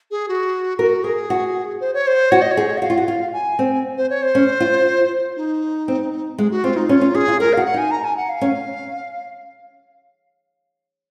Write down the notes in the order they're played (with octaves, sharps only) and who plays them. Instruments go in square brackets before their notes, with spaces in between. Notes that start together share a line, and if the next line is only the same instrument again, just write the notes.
[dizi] G#4
F#4
[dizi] F#4 [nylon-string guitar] A#4
[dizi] G#4 [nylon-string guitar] A#4
[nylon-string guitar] F#4
[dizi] C5
C#5
C5
[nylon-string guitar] F#4 [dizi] C#5
[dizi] D#5
C#5
[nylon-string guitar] G#4
[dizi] F#5
[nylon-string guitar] F#4 [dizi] F5
[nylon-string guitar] F4
F#4
F4
[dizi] G#5
[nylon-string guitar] C4
[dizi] C5
C#5
C5
[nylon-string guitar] C#4
F4
[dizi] D#4
[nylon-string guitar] C4
[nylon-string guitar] G#3 [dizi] G#4
[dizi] F#4
[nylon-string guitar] C4 [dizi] F4
[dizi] D#4
[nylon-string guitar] C#4 [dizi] F4
[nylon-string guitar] C#4
[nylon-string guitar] C#4 [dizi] G#4
[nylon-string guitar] F4
[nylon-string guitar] G#4 [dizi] A#4
[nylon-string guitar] F#4 [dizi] F5
[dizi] F#5
[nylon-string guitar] D#4 [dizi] G#5
[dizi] A#5
G#5
F#5
F5
[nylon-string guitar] C#4